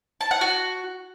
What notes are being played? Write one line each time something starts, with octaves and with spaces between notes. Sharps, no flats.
A5
F#5
F#4